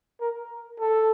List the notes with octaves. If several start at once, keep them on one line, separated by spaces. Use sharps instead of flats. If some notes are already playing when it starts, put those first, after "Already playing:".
A#4
A4